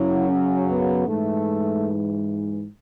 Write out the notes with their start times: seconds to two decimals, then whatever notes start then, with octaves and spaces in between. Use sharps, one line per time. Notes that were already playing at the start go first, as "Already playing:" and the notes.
Already playing: F#2 C#3 F#3 E4
0.28 C#4
0.68 B3
1.06 G#2 E3 A3